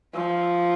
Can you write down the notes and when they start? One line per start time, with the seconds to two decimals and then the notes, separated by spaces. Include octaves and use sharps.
0.14 F3